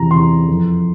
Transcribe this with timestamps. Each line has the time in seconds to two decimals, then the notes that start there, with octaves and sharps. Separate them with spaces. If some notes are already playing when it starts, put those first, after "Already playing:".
Already playing: E2 C3 E3 A#5
0.11 E2 C3 E3 C6
0.47 F2 E3